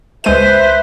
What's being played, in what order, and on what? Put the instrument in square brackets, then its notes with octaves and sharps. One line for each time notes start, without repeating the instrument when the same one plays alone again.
[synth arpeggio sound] C#2 G#3 D#7 [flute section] B4 E5 [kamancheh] C5